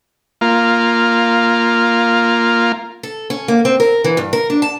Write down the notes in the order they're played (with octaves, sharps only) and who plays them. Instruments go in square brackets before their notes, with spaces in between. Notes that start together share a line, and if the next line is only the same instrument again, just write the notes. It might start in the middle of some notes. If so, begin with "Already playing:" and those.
[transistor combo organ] A#3 F4
[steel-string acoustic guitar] A4
C#4
A#3
C4
A#4
E3
G2
A#4
D4
A5